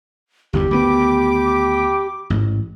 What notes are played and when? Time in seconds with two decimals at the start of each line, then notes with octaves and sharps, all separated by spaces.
0.53 G1 E2 G2 G4
0.71 D2 D#3 B3 G5 B5 D6
2.30 A1 G#2